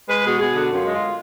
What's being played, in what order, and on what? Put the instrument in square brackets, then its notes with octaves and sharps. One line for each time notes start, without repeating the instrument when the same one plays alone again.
[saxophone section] G#3 B4
B2 G#4
B2 G#4
D3 F#4
F#2 F4
G#3
F4